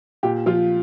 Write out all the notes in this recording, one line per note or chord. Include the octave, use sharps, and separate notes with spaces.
A#2 G4
F3 F4